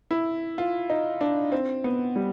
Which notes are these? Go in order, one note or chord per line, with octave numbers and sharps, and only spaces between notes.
E4
F4
D#4
D4
C4
B3
G3